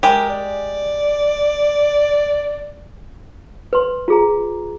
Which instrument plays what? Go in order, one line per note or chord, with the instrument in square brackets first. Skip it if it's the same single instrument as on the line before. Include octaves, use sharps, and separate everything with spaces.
[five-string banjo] G#3 G4 [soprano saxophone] A#4
[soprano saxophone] D5
[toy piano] B4 C6
F4 G#4 A#5